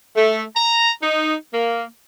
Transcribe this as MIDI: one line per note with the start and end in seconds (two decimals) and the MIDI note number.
0.17 0.43 57
0.57 0.91 82
1.03 1.34 63
1.53 1.86 58